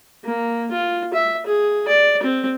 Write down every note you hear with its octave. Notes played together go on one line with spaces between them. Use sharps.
A#3
F4
E5
G#4
D5
C4